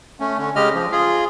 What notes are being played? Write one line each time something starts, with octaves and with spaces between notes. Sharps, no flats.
A3 C#4
D3 C#4
C#3 G#3 G4 D#5 F6
F3
F4 G#4